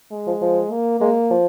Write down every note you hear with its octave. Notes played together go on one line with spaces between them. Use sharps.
G#3
F3
F3
A#3
G#3 A#3
F3